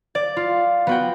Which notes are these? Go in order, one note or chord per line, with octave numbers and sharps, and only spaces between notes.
D5
F4
B3 F#4 G5